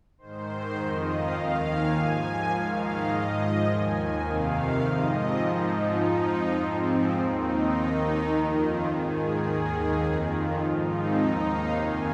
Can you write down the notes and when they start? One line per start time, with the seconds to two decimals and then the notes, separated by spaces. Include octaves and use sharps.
0.18 G#2 D#3 C5
0.76 F2 D#3 D#5
1.05 F5
1.34 D#2 D#3
1.63 G#5
1.92 G#2 F3
2.49 G#2 D#3 F5
2.78 D#5
3.07 G#2 F3
3.65 D#2 D#3 G#5
3.93 G#5
4.22 F2 C3 D#3 F5
4.80 G#2 F3 D#5
5.09 C4
5.38 G#2 F3 D#4
5.67 D#4
5.96 F2 F3
6.54 G#2 F3 C4
7.11 D#2 D#3 D#4
7.40 C4
7.69 D#2 D#3 D#4
8.27 F2 D#3
8.56 F4
8.84 G#2 D#3 G#4
9.13 G#4
9.42 D#2 D#3 G#4
10.00 F2 D#3
10.29 F4
10.57 G#2 F3 D#4
10.87 C4
11.16 D#2 D#3 D#4
11.44 F5
11.73 F2 C3 D#3 G#5